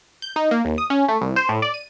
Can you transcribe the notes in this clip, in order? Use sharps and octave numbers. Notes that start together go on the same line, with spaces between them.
G6
D#4
A#3
D#2
D#6
C#4
A3
C2
C5
A2
D5
D#7